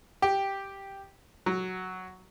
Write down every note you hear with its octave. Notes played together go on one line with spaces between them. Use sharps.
G4
F#3